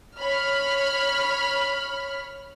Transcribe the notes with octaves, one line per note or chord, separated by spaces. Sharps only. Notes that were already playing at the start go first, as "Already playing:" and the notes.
C#5 B5 F6